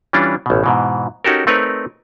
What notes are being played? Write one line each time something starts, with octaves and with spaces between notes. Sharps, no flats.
E3 G3 C#4 D4 F4
A1 B2
G#2 B2 E3
C#4 D#4 F#4 G4 A4 A#4
A3 C4 D#4 A#4 B4 C#5